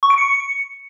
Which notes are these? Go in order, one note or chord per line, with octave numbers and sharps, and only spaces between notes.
C#6
D7
C#7